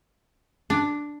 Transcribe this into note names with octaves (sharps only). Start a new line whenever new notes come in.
D4